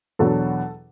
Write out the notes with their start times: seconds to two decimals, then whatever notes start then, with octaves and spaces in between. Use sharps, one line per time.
0.19 E2 B2 F#3 D4 A4